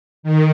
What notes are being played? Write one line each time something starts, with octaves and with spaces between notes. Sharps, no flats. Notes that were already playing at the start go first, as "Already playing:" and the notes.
D#3